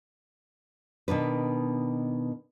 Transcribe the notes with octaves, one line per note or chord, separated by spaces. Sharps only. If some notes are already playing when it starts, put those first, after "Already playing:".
B2 D#3 D4 B4